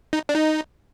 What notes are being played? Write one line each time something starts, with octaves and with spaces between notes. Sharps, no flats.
D#4
D4
D#4